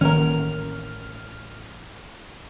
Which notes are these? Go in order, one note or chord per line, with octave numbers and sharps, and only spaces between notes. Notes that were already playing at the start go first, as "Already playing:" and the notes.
A1 D#3 A#3 C#4 A#4 F6